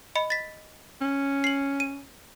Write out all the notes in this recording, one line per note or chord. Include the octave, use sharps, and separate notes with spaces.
D#5 B5 C#7
A6 B6
C#4
C7 F#7
D#7